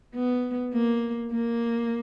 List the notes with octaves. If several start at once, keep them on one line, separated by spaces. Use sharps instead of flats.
B3
A#3
A#3